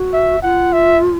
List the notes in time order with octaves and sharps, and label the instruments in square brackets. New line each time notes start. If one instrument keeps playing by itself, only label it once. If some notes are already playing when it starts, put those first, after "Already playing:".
Already playing: [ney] F#4
[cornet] E5
[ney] F4 [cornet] F#5
[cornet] E5